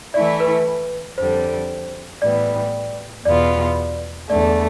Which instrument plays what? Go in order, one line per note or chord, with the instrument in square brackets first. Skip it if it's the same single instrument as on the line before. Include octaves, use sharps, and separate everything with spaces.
[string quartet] E3 A3 E4 [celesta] D5
[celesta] B4
[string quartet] F2 D3 G3 [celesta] C5
[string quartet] A2 E3 G3 B3 [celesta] D5
[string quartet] E2 B2 B3 F4 [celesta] D5
[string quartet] E2 D3 A3 [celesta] D5